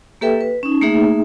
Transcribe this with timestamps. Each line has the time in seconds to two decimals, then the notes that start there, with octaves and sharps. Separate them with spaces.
0.21 A#3 G4 A4 B4 E5 G5
0.41 B4
0.63 C#4 D#4
0.81 A3 A#3 D#4 G#4 E5